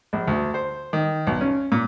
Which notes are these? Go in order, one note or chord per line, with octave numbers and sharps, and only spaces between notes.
A#1
D2
C5
D#3
B1
C#4
A#2